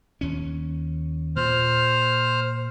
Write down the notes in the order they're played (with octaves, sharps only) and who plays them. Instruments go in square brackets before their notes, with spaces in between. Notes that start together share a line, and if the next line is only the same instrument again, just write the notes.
[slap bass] D#2 C#4
[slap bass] A#2 [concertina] C5 F6